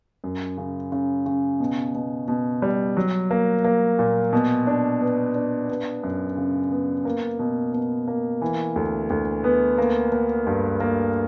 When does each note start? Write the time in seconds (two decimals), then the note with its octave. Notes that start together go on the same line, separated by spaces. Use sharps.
0.24 F#2
0.58 C#3
0.92 C#3
1.26 C#3
1.60 B2
1.95 B2
2.28 B2
2.62 G3
2.97 F#3
3.31 A#3
3.64 A#3
3.99 A#2
4.33 B2
4.67 D4
5.01 B3
5.35 D4
5.69 B3
6.03 F#2
6.37 C#3
6.71 B3
7.05 A#3
7.39 B2
7.73 B2
8.08 A#3
8.42 E3
8.76 D2
9.10 D2
9.44 B3
9.78 A#3
10.12 A#3
10.47 G2
10.80 A#3